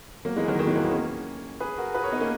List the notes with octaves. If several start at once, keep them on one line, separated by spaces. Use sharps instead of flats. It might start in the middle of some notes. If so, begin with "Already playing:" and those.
F#3 A#3
E3 G#3
D#3 F#3
D#3 F#3
E3 G#3
F#3 A#3
G#3 B3
A#3 C#4
G#4 B4
F#4 A#4
G#4 B4
A#4 C#5
B3 D#4
A#3 C#4